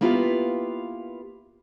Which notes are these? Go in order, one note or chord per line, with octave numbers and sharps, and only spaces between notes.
A#3 B3 E4 F4 G4 B4